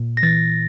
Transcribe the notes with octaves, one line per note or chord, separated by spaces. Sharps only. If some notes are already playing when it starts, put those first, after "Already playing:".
Already playing: A#2
A#6
E3 A6